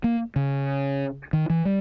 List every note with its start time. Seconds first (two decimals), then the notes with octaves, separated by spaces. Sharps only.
0.04 A#3
0.36 C#3
1.33 D#3
1.50 E3
1.65 G3